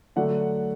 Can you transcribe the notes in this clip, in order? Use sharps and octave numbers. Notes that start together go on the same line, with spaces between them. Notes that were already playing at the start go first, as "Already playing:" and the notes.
D3 F#3 A3 D4 F#5